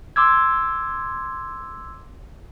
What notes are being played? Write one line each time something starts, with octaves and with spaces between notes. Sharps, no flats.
C6 D6 E6 G#6